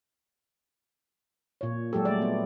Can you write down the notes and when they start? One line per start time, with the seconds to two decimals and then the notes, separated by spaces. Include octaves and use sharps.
1.61 A#2 C#5
1.93 F#3 G#3 G4 A4
2.05 G3 A3 D5
2.22 B3